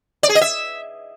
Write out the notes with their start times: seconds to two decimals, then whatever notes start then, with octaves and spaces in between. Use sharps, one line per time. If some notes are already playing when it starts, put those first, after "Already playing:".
0.23 D5
0.29 G#4
0.35 D#5
0.41 E5